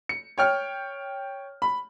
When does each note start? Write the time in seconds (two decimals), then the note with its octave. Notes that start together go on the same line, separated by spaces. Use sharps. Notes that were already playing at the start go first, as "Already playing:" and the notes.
0.09 C#7
0.38 C#5 G5 F6
1.62 B5